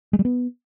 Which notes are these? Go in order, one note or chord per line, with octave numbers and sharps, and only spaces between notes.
G#3
G3
B3